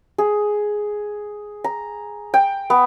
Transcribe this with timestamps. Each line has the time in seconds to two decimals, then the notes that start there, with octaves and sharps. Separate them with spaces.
0.18 G#4
1.64 A#5
2.34 G5
2.70 B3